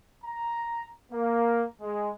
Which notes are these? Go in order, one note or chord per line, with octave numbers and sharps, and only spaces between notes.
A#5
A#3
G#3